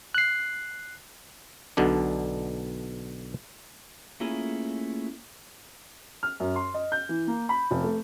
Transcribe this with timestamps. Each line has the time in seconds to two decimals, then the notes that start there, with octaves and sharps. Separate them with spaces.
0.15 F#6 C7
1.77 B1 B2 D3 D4
4.20 A3 A#3 C#4 E4 F4 G#4
6.23 F6
6.40 F#2
6.56 C6
6.74 D#5
6.92 G6
7.09 E3
7.27 A#3
7.49 B5
7.71 F1
7.84 A3